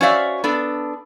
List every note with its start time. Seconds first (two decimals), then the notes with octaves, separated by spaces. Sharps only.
0.01 C#4 F#4 C5 D5 E5 F5
0.44 B3 D4 A4